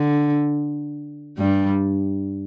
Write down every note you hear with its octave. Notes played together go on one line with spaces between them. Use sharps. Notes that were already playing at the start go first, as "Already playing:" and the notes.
Already playing: D3
G2 G3